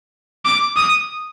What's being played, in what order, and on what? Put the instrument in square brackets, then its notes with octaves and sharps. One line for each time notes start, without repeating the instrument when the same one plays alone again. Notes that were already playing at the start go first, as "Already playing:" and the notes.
[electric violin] D6
D#6